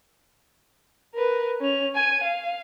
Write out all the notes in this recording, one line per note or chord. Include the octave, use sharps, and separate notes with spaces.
A#4 B4
C#4 F7
G#5 D#7
F5